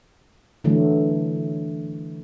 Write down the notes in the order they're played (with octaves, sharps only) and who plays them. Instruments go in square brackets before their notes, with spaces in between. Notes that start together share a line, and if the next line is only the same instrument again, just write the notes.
[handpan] D3 E3 F#3 A3